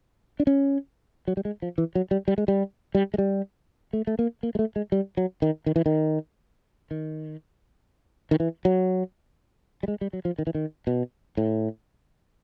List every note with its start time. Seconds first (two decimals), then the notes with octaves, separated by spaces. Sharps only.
0.40 D4
0.47 C#4
1.28 F#3
1.37 G3
1.45 G#3
1.62 F3
1.78 E3
1.95 F#3
2.11 G3
2.28 G3
2.38 G#3
2.48 G3
2.95 G3
3.14 G#3
3.18 G3
3.93 A3
4.07 A3
4.19 A#3
4.43 A#3
4.55 G#3
4.59 A3
4.76 G#3
4.92 G3
5.17 F#3
5.42 D#3
5.66 D#3
5.76 E3
5.86 D#3
6.91 D#3
8.31 D#3
8.40 E3
8.65 F#3
9.83 G3
9.88 G#3
10.01 G3
10.13 F#3
10.25 F3
10.39 D#3
10.47 E3
10.55 D#3
10.87 B2
11.37 A2